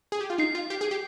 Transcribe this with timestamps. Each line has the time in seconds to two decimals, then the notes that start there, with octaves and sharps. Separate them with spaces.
0.12 G#4
0.21 G4
0.30 F4
0.38 D#4 C7
0.55 F4
0.70 G4
0.81 G#4
0.91 G4